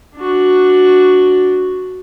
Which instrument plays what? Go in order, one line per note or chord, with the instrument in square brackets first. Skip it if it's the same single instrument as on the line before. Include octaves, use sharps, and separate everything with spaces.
[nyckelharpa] D4 F#4